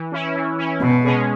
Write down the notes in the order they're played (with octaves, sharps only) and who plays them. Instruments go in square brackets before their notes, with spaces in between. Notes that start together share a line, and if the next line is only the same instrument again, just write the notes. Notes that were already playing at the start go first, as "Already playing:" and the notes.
Already playing: [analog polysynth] E3
C#4 E4
E3
C#4 E4
[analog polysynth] G#2 [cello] B2
[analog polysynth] G#3 C#4 G#4